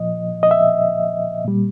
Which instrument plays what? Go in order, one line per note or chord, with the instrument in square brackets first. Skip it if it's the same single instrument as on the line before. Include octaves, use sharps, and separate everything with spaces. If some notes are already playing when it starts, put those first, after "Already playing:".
Already playing: [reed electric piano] A#2 F3 D#5
D#5
E5
A#2 G3